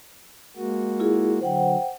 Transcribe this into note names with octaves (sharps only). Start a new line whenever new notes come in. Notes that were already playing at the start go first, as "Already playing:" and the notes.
G#3 A#3 F#4
E4 F4 G#4
D3 F#3 C5 F#5 G5